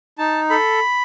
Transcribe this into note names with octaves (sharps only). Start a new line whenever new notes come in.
D#4 A5
A4 B5